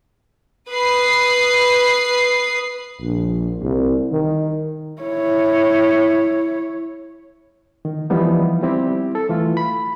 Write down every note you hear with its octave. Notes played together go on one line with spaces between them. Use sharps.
B4 D#6 C7
A#1
C2
D#3
E4 C#5
D#3
E3 F3 G3 B3 D#4
G3 C4 E4 G4
A4
E3 A3 F4
B5